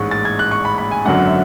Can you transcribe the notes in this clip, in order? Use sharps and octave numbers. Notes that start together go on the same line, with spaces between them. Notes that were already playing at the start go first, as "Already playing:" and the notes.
Already playing: A1 G#2 G#3 C#6 F#6
A6
G#6
F#6
C#6
B5
B5
G#5
G#1 F#2 D3 F#3 F#5
E5